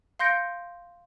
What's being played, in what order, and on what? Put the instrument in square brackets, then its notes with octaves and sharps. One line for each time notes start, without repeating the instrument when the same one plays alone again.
[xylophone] F5 C6 G6 A#6 C#7 D7